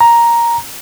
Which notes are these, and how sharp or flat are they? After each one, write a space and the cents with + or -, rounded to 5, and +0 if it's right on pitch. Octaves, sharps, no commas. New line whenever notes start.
A#5 +5